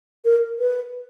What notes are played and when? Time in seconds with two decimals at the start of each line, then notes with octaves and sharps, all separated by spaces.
0.25 A#4
0.59 B4